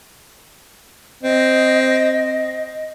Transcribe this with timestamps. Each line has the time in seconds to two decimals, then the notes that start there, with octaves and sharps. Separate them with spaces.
1.23 C4 D#5